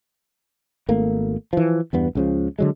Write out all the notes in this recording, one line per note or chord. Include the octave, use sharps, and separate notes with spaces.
G#1 A3 A#3
E3 F3
E2 G2 B3
C#2 C#3 F3
D3 F#3 G#3